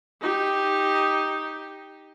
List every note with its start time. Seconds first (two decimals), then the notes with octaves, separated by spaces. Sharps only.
0.21 D#4 G4